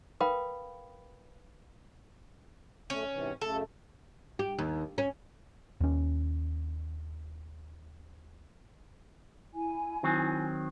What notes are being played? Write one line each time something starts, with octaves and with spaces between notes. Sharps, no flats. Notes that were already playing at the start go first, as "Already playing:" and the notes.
A#4 B4 F5 G5 B5 D#6
F#2 A3 C#4
G#2 C3 E3
F#2 C#3 A3 A4
G4
D#2
C#4
D#2 C#4
E4 G#5
D#3 F#3 C4